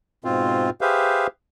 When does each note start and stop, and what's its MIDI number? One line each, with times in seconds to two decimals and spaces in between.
0.25 0.70 44
0.25 0.70 47
0.25 0.70 60
0.25 0.70 65
0.81 1.27 67
0.81 1.27 68
0.81 1.27 71
0.81 1.27 72
0.81 1.27 76
0.81 1.27 77